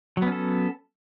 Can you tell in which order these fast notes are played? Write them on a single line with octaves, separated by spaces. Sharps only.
F#3 B3 C#4 A4